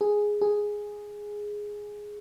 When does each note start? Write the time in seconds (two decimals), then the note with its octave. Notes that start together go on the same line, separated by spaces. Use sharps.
0.01 G#4
0.41 G#4